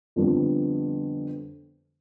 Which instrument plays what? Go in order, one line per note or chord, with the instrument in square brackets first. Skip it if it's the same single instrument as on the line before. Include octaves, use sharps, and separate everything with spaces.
[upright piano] F2 D3 G3 B3